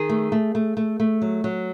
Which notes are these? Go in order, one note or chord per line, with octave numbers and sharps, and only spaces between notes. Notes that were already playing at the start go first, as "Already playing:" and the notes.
Already playing: D#3 G#4
A3
A3
A3
A3
A3
F#3
F#3